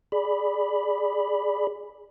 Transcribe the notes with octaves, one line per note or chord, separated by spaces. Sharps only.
G#4 D5 B5